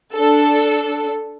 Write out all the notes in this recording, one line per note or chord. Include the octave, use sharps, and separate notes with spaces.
D4 A4